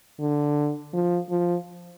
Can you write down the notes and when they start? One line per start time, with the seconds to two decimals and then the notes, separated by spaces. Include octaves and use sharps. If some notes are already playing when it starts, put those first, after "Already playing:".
0.20 D3
0.94 F3
1.30 F3